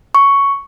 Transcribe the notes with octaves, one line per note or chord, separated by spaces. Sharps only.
C#6